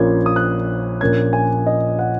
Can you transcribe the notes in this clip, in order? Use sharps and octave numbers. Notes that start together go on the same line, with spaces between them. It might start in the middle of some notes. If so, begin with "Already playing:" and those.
Already playing: A#1 A#2 A#3 C#4 G#6
D#6
F#6
A#1 A#2 A#3 C#4 G#6
G#5
D#5
F#5